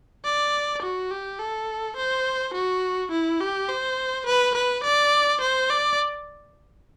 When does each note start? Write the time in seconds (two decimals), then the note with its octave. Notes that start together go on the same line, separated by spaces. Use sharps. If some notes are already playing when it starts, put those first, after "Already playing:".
0.25 D5
0.82 F#4
1.11 G4
1.39 A4
1.96 C5
2.54 F#4
3.12 E4
3.40 G4
3.69 C5
4.26 B4
4.55 B4
4.84 D5
5.41 C5
5.70 D5